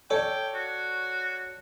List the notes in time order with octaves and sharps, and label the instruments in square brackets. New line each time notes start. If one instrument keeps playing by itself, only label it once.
[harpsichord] A4 [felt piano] C#5 D5 [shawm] G5
[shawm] F#4